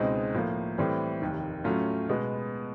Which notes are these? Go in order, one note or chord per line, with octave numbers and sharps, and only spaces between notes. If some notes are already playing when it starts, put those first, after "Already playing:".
Already playing: C#2 B2 G#3 C4 D#4
A2 F3 A#3
A2 E3 G3 C4
F1 D#2 D#3
A2 F#3 A3 C#4 F4
B2 G#3 B3